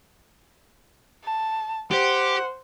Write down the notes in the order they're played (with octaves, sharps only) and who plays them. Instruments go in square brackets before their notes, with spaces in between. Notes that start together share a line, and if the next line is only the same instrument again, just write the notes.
[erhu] A5
[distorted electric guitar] G4 [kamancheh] C5 [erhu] F#5